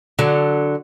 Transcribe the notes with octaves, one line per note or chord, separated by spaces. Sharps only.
D3 F#3